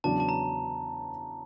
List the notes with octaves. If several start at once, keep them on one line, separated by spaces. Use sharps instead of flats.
E2 C#3 F#3 B3 D4 A5
A5
A#5